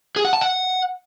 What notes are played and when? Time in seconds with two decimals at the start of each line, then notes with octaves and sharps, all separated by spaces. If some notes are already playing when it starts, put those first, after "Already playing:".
0.16 G#4
0.25 F#5
0.33 A5
0.41 F#5